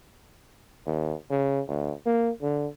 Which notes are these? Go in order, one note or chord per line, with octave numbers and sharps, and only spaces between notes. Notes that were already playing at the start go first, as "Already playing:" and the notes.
D#2
C#3
D2
A#3
D3